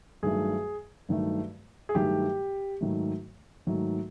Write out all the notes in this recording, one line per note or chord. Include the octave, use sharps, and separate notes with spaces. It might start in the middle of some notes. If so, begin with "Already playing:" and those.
G2 D#3 F#3 A3 G#4
G2 D#3 F#3 A3
G#4
G2 D#3 F#3 A3 G4
G#2 D#3 F#3 A3
G#2 D#3 F#3 A3